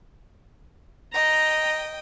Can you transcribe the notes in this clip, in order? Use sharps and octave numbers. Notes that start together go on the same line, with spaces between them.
D#5 G5 A#5